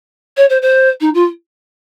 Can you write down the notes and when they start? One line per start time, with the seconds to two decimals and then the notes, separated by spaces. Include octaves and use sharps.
0.37 C#5
0.49 C5
0.62 C5
1.00 D#4
1.14 F4